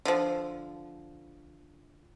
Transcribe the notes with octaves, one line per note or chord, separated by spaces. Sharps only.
D3 F3